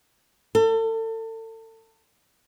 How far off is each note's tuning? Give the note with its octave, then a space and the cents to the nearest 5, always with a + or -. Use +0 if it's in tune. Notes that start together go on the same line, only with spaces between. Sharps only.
A4 +35